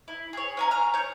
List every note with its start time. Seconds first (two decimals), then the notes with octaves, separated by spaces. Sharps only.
0.08 E4
0.33 G#4 C#5
0.57 C#4 G#5 A#5
0.71 A#5 F6
0.94 C#5 G6